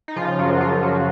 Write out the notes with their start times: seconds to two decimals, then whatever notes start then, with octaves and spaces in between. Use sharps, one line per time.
0.08 D#4
0.16 C#3 F3 F4
0.39 F#2 F#3 F#4
0.60 F#2 F3 F4
0.82 F3 F#3 F#4